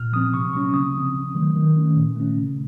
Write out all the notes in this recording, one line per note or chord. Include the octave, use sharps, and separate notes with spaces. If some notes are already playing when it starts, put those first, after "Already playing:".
Already playing: A#2 F6
F3 C4 D#6
C3 C#6
F#3 A#3 C#4 C#6
C#3 D#6
F3 C4
C3
D#3 F#3 A3
D#3
A3 C#4
A#2
A3 C#4
C#3